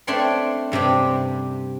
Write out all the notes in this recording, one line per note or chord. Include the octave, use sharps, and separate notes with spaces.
A3 C4 D4 C#5 G5 C6
G2 C3 D4 G4